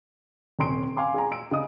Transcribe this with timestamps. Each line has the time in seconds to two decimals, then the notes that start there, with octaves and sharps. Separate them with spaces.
0.59 D#1 C3 C#4 C6 D7
0.97 F5 G#5 C6 D6
1.14 G#4 G#5 A#5
1.31 E6 D7
1.51 C#3 D#5 D#6